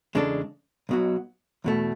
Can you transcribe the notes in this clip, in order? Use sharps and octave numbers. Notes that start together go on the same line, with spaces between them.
E2 C#3 G#3 D4 A4
B1 B2 F#3
E2 B2 A3